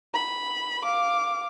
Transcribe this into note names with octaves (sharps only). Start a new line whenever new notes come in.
B5
F5 D6